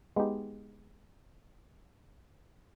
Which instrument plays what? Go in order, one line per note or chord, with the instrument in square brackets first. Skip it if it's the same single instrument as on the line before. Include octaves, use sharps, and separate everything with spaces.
[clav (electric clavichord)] G#3 B3 D#4 G4